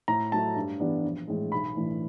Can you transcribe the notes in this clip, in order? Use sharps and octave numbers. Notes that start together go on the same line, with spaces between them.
A2 A#5
F#3 A3 A5
G2
E3 G3 B3 D4
A#1
A2 E3 G#3
B1 B5
A2 E3 A3 D4